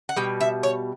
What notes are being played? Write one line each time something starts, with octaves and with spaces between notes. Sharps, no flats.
F#5
B2 G3 G5
E5
C#5